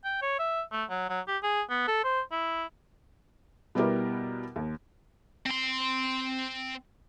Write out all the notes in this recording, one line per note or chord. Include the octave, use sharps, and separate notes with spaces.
G5
C#5
E5
A3
F#3
F#3
G4
G#4
B3
A4
C5
E4
B2 G3 B3 E4 G4 A#4
D#2
C4 C6